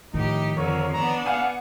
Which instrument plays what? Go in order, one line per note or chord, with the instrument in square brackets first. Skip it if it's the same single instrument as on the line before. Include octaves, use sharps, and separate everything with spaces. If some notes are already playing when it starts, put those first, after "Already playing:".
[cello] A2 G4 [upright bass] D#3 F3 [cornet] D#4
[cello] F2 D3 [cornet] A#4 [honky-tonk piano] C#5
[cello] B3 D4 [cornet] A#5
[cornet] F5 [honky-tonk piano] F#5 G#5